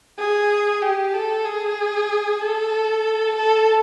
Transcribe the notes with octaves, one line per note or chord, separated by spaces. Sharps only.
G#4
G4
A4
G#4
A4
A4